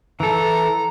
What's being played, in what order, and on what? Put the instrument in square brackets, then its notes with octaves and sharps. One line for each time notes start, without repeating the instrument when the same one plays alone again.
[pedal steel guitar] E3 A4 [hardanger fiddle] A#5